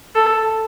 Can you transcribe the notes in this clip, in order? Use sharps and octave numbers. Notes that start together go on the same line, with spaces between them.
A4